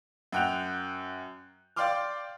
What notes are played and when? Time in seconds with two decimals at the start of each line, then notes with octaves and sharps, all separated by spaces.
0.32 F#2 F#5 G5 F#6 G6 F7
1.76 D5 F5 G5 C6 D6 F6